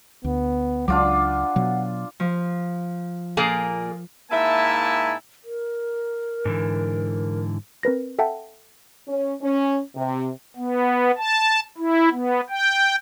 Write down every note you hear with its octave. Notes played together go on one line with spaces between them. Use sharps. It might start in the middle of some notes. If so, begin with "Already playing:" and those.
D2 B3
C#2 F#3 D4 F4 F#5 D6
B2 F#3
F3
A#2 A#3 G#4
G#2 A#3 E4 E5 G#5 A5
A#4
G#2 D3 E3
C4 A#4 B4 A#6
A4 E5 F#5 G5 A5
C#4
C#4
C3
B3
A5
E4
B3
G5